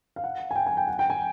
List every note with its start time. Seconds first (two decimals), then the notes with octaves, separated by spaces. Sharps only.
0.16 F5
0.24 F#5
0.51 G#5
0.56 G5
0.66 G#5
0.77 G5
0.88 F#5
0.99 G5
1.10 G#5